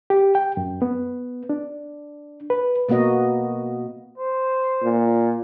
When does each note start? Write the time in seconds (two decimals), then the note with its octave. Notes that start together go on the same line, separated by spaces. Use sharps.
0.10 G4
0.35 G5
0.57 F#2
0.82 B3
1.49 D4
2.50 B4
2.89 B2 A#3 B3 F#4 D#5
4.18 C5
4.83 A#2